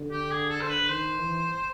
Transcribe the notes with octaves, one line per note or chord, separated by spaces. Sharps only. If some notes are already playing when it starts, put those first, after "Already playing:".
Already playing: D3
G4
G#4
A4
C5
B4
D#3 C5
E3